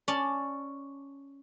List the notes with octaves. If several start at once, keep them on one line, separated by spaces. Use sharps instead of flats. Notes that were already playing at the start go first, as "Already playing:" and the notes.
C#4 D5 A5